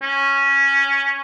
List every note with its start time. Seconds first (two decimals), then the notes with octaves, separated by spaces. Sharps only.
0.03 C#4